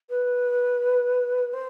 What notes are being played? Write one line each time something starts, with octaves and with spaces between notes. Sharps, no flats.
B4
C5